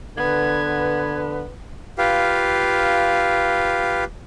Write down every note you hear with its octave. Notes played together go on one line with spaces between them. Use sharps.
D3 B3 B4 G#6
F4 G4 B4 F5